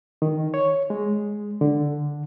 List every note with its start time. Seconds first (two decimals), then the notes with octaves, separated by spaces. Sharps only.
0.22 D#3
0.54 C#5
0.90 G#3
1.61 D3